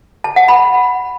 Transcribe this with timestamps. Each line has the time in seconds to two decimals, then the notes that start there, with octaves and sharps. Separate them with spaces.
0.24 A5
0.36 F#5
0.48 B5